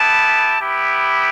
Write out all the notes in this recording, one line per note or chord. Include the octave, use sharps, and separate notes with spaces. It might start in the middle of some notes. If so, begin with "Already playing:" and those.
Already playing: B3 E4 G4 A5
B3 E4 G4